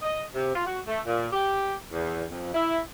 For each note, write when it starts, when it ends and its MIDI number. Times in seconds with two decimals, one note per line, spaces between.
0.02 0.22 75
0.34 0.53 48
0.54 0.66 65
0.66 0.81 66
0.86 1.00 57
1.06 1.27 46
1.32 1.72 67
1.91 2.23 40
2.29 2.50 41
2.54 2.77 64